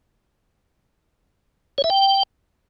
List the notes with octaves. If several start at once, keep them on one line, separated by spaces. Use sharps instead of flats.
C#5
E5
G5